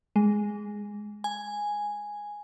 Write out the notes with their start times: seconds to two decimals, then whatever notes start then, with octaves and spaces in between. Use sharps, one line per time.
0.16 G#3
1.24 G#5